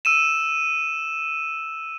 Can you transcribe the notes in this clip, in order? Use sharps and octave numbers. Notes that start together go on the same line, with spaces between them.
E6 D#7 E7